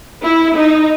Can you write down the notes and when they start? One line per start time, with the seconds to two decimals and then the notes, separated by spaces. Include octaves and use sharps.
0.23 E4
0.56 D#4